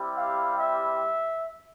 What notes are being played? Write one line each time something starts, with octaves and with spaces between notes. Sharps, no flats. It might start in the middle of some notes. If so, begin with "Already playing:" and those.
Already playing: G3 C4 E4 G4
F5
E5